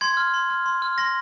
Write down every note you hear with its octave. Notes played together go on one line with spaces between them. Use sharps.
C6 G#6
F6
C6
F6
C6
F6
C6 A#6